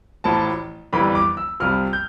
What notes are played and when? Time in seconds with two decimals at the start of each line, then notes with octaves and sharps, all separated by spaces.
0.24 A1 A2 F3 A5
0.93 G1 F2 E3 G3 B5
1.15 D6
1.37 E6
1.60 C2 C3 F3 F6
1.93 G6